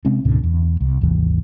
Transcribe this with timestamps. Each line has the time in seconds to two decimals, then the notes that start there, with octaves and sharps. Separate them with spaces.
0.05 C3 G#3 C4 C#4
0.25 C#2 G#2 B2 D3
0.43 E2
0.81 C2
1.01 G#1 D#2 C3 E3